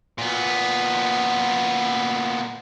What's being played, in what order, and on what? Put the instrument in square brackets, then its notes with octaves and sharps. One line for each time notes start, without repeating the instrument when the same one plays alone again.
[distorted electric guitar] A#2 B3